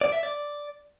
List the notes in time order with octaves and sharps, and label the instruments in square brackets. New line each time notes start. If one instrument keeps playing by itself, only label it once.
[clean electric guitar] D5
E5
D5